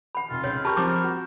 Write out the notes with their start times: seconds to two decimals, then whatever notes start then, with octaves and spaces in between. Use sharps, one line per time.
0.15 F#5 B5
0.30 F1 F4
0.44 C#2 C#5
0.65 G4 A#4 A5 B5 C#6 G6
0.77 F3 C4 D6
1.04 F#4